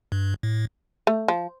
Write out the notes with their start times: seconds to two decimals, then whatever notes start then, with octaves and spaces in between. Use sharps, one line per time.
0.12 G2
0.43 A2
1.07 A3
1.28 F3